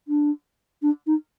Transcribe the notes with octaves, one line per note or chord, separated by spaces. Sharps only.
D4
D4
D#4